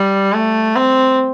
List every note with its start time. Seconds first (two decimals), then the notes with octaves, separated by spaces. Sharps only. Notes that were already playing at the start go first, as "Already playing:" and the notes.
Already playing: G3
0.33 A3
0.76 C4